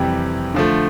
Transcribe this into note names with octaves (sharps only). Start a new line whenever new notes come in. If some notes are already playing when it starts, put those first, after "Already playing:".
Already playing: F2 C3 E3 G3
D3 F3 A3